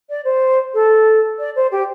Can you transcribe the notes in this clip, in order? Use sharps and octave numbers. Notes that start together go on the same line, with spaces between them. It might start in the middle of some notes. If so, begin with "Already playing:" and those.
D5
C5
A4
D5
C5
G4